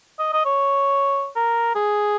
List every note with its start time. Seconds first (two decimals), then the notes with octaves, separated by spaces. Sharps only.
0.19 D#5
0.33 D#5
0.45 C#5
1.36 A#4
1.75 G#4